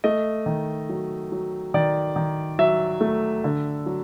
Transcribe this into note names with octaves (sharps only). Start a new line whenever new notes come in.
A3 D#5
D#3
F#3
F#3
D#3 D5
D#3
F#3 E5
A3
D3
F#3